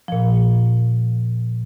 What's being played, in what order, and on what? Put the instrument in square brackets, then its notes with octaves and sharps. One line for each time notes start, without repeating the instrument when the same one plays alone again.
[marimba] A#2 F3